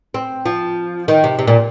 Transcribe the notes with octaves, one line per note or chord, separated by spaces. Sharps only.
C4
F3
D#3
C3
C3
A#2